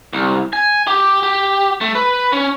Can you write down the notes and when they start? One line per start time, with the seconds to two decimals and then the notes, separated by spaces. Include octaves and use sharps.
0.13 C2
0.53 G#5
0.87 G4
1.23 G4
1.81 A3
1.95 B4
2.32 C#4